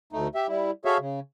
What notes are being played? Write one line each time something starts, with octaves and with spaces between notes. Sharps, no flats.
D2 A3 D#4
G4 E5
G3 E4
F#4 G#4 A4 C#5 E5 F5
C#3